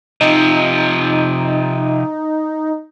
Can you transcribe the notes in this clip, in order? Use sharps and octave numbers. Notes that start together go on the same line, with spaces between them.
C3 F3 D#4